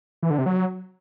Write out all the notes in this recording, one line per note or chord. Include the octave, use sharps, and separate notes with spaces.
E3
D3
C3
F#3